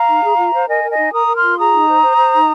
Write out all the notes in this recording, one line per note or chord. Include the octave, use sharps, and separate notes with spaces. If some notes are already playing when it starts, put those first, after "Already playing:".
Already playing: F5 A#5
D#4
G#4
F4
C5
A#4 D#5 G#5
A#4
D#5 G#5
D#4
A#4 A#5 D#6
A#4
C6 F6
F4
G#4 A#5 D#6
D#4
C5
C5
C5
D#4